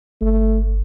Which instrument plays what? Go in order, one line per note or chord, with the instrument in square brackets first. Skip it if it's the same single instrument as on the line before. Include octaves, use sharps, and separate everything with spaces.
[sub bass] G1 [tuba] A3